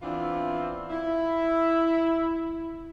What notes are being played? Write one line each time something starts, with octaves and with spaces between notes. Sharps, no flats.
E3 B3 C4 D4 E4 F4
E4